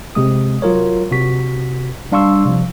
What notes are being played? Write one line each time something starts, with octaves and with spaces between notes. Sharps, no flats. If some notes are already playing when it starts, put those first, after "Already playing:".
G1 C3 G#3 D#6
F#3 F4 A#4 C#5
C3 F#4 C#6 B6
G3 D4 F5 C6 C#6 E6
C3 F3